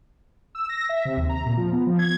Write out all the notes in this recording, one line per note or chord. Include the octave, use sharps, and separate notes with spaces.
E6
A#6
E5
C3
D#2
A#5
A#2
F3
B3
F3
G#6